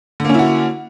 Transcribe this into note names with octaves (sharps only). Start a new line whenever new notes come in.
D3 A#3 C#4 E4 F#4